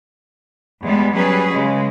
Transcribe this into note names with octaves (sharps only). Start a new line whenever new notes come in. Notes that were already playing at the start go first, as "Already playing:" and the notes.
E2 G3 G#3 B3
F#3 G3 C#4 G#4 B4
C#3 G#3